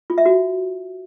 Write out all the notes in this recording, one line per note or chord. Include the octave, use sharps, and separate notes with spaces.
F4
E5
F#4